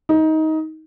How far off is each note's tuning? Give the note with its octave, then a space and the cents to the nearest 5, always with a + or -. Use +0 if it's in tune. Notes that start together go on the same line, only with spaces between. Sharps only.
D#4 +20